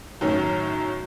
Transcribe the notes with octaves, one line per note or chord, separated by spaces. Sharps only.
F#2 A2 D#3 C#4